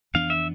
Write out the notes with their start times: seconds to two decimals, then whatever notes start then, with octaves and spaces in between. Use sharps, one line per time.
0.14 F2 E3 B3 D4 F5
0.30 E5